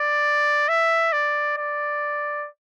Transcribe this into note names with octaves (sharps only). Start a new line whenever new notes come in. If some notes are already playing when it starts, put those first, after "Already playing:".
Already playing: D5
E5
D5
D5